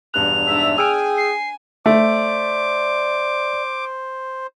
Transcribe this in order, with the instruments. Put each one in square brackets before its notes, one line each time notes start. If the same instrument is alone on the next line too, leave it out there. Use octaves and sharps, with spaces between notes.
[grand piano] E1 G2 F#6 [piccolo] F7
[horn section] G#2 E5 [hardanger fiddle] D4
[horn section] G#4 G5 [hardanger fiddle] G#5 [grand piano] E6 F6 D7
[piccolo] C7
[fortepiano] A3 [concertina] C5 [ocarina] D5 [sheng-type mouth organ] D6